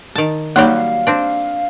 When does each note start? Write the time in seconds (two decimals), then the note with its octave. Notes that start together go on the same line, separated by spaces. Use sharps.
0.16 D#3 A5
0.56 F#3 G3 A#3 D#4 C#5 F5
1.07 C4 D4